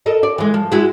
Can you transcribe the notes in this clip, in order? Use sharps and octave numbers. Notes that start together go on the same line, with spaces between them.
A4 A#4 D#5
D5
E3 G#3
F3
G#3 E4 F#4